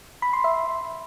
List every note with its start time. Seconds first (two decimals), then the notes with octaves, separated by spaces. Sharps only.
0.22 B5
0.33 C6
0.44 E5